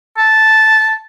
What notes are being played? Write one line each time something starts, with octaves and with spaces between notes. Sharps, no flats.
A5